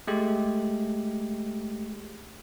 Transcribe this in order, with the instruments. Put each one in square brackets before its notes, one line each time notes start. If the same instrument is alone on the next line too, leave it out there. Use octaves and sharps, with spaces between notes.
[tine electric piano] G#3 A3 G4